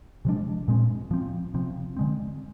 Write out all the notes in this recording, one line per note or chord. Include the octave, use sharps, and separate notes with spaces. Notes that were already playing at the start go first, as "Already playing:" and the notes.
C3 F3 G#3 D4
A#2 G#3 C4
F3 C4
C3 F3 C4
D3 G#3 C4